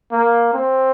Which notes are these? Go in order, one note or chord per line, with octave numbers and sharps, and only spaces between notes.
A#3
C4